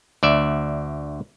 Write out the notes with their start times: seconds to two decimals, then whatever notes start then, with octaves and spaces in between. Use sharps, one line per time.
0.23 D2 D5 E5